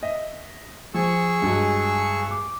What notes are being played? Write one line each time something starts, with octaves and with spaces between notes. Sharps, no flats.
D#5 E5
F3 G#4 C#6 E6
G2 F#3 G#3
D6